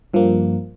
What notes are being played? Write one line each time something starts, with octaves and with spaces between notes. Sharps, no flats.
G2 F3 A#3